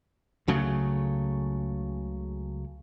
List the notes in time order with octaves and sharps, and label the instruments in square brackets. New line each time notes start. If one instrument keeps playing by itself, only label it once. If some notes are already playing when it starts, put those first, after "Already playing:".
[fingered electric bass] C#2 C#3 F#3 A3